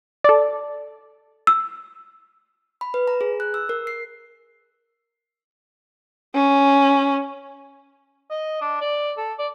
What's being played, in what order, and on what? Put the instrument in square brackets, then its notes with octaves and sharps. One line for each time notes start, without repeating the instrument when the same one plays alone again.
[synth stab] A4 D5
[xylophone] E6
[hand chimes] B5
B4
A#5
G#4
F#6
E6
A#4
C7
[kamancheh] C#4
[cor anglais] D#5
D4
D5
A4
D5